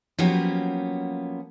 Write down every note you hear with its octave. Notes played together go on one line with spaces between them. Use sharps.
F3 F#3 A#3 B3 C#4 G4